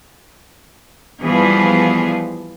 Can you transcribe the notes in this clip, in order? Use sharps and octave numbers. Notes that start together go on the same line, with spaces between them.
E3 F3 G3 B3 G#4